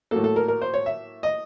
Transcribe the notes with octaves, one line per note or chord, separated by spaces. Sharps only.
A2 F#3 A#3 A4
A4
A#4
A#4
C5
C#5
E5
D#5